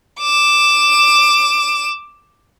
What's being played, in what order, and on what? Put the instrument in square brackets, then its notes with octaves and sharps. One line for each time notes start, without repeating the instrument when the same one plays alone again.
[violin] D6 E7